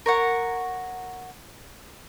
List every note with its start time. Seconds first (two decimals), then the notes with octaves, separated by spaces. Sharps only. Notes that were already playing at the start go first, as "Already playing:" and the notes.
0.06 A#4 C#5 F#5